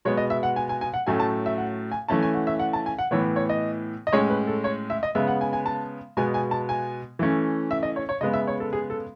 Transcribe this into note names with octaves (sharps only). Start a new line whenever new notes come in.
B2 G#3 B3 C#5
D#5
E5
F#5
G#5
G#5
G#5
F#5
A2 F#3 A3 C#4 G#5
A5
E5
F#5
G#5
E3 A3 C#4 A5
G#5
F#5
E5
F#5
A5
G#5
F#5
A2 E3 B3 C#5
C#5
D#5
D#5
A2 G#3 C#4 C#5
B4
A4
C#5
E5
D#5
C#3 G#3 B3 E5
F#5
G#5
G#5
A5
B2 G#3 B3 G#5
G#5
A5
G#5
E3 A3 C#4
E5
D#5
C#5
C#5
C#3 G#3 B3 D#5
E5
C#5
A4
G#4
A4